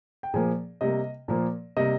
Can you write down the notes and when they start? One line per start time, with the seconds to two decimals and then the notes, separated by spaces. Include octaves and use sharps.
0.23 G5
0.33 A#2 F3 A#3 G#4 G#5
0.81 C3 G3 A#3 D#5
1.28 A#2 F3 A#3
1.77 C3 G3 A#3 D#5